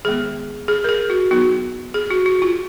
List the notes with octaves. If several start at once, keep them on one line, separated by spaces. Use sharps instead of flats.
D#3 G#3 B3 G#4
G#4
A#4
G#4
F#4
F#3 B3 D#4 F#4
G#4
F#4
F#4
F4